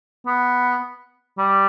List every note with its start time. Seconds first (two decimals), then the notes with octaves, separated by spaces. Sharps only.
0.27 B3
1.38 G3